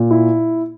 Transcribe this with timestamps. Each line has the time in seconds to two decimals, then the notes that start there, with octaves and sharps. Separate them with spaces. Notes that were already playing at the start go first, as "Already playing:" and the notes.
Already playing: A#2
0.11 E4